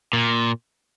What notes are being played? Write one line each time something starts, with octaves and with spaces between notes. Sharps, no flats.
A#2